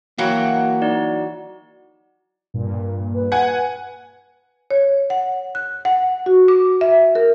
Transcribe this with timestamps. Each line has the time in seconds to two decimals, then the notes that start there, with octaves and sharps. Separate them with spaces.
0.18 E3 F#3 A#3 F#4 F5 G5
0.82 D#4 D5
2.54 G2 A#2
3.14 B4
3.32 F#5 G#5
4.70 C#5
5.10 F#5
5.55 F#6
5.85 F#5
6.26 F#4
6.48 D6
6.81 E5
7.15 A#4